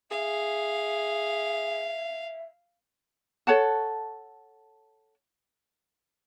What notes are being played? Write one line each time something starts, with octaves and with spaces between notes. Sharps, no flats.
G#4 E5 F5
A4 C#5 F#5 A5